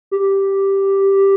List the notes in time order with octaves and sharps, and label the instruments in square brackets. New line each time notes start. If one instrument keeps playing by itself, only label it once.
[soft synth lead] G4